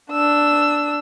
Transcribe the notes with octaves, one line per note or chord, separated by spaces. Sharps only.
D4 E6